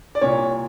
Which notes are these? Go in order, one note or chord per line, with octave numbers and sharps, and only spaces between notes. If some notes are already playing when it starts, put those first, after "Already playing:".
D5
C2 A#2 C#5